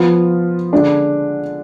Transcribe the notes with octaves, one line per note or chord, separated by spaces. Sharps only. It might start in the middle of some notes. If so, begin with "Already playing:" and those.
Already playing: F3 B3 F4
D3 G#3 D4